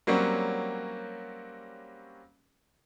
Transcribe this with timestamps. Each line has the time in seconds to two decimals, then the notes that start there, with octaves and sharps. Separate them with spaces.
0.07 F#3 G3 A#3 C4 C#4 F#4